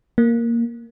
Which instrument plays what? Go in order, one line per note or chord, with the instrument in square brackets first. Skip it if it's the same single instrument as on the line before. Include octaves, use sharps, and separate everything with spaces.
[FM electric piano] A#3